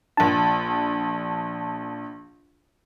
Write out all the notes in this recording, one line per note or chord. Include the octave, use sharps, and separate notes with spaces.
A#1 D4 A5